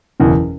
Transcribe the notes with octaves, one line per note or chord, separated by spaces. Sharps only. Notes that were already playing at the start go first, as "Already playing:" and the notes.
F#1 E2 B2